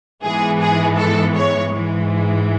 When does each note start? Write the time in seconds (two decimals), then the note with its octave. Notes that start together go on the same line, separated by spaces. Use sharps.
0.24 G#2 E3 G#3 B3 G#4
0.61 G#4
0.98 A4
1.35 C#5
1.71 G#2 E3 G#3